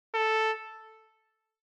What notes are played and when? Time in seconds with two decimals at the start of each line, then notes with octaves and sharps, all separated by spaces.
0.15 A4